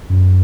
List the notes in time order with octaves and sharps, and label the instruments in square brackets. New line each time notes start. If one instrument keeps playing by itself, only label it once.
[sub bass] F#2